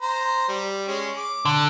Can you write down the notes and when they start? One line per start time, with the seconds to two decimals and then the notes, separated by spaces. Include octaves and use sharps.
0.02 C5 A#5
0.48 G3
0.88 G#3 C#4
1.17 D6
1.45 D3